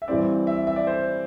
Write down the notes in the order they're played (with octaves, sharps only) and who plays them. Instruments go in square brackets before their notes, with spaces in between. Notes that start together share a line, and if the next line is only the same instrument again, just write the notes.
[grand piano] E5
G2 E3 G3 C4 E4 D5
E5
E5
D5
C5